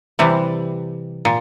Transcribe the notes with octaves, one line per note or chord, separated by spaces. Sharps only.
C3 E3 G3
A#2